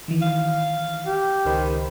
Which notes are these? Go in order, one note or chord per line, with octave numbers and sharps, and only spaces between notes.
D#3 E3
F5
G4
C#2 D#3 C5 B5